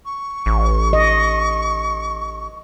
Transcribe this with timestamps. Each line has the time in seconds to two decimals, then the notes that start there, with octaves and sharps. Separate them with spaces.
0.06 C#6
0.46 A1
0.93 D#5